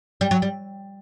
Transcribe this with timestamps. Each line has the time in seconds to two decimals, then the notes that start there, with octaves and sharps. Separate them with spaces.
0.21 G3
0.31 F#3
0.42 G3